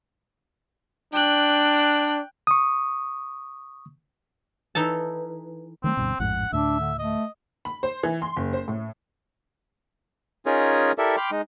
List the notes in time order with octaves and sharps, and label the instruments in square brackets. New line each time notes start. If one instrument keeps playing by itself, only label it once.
[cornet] D4 [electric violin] G5 F#6
[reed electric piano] C#6 D#6
[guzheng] E3 D#4 A4 A5
[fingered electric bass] D#3 F#3 A3 [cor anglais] C4
[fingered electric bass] D2 G2 B2
[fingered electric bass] A1 F2 G#2 [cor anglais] F#5
[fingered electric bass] D2 A2 [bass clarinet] D4 [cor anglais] E5
[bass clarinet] D3
[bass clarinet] A3 [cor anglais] D#5
[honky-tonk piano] B5
C5
E3
C6
F#1
C5
A2
[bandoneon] C#4 D#4 F4 G#4 A#4 C#5
E4 G4 A4 A#4 D5 E5
G5 B5 C6 D6 F6
G#3 D#4